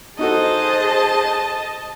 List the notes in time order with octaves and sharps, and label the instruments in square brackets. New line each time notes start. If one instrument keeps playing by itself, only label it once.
[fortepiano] D#4 F#4 A4 [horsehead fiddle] G#4 C5 [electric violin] D#5 [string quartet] A5